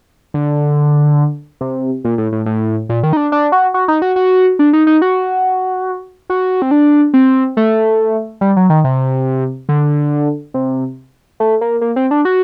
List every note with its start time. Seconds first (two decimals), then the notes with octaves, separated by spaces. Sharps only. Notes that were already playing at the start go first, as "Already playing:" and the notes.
0.34 D3
1.61 C3
2.04 A#2
2.18 A2
2.32 A2
2.46 A2
2.89 A#2
3.03 D#3
3.13 D#4
3.17 D4
3.32 D4
3.52 F#4
3.74 F#4
3.88 D#4
4.02 F#4
4.16 F#4
4.59 D4
4.73 D#4
4.87 D#4
5.02 F#4
6.30 F#4
6.62 C4
6.71 D4
7.14 C4
7.57 A3
8.41 G3
8.56 F#3
8.70 D#3
8.84 C3
9.69 D3
10.54 C3
11.40 A3
11.61 A#3
11.81 A#3
11.96 C4
12.11 D4
12.25 F#4